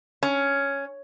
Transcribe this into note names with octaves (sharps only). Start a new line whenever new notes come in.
C#4